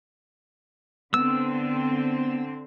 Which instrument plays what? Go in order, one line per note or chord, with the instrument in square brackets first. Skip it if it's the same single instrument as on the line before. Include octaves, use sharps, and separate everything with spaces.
[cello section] D3 C4 [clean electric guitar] B3 [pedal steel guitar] E6